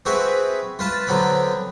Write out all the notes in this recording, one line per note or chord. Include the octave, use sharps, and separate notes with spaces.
C4 F#4 G#4 B4 E5
F4 B4 A5
D3 F#3 B3 C4 B5